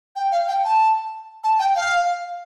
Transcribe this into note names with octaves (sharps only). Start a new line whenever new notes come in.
G5
F5
G5
A5
A5
G5
F5